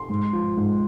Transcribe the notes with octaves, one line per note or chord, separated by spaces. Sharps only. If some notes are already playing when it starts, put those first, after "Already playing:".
Already playing: C6
G#2
F3
G#2